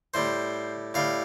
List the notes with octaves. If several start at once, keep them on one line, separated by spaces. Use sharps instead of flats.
A2 G3 C5
A2 G3 F5